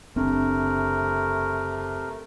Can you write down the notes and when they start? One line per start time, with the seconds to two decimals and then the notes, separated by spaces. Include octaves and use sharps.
0.16 F#1 C3 A3 C4 D4 A#4